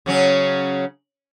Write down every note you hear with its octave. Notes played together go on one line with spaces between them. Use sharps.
C#3 F#3 C#4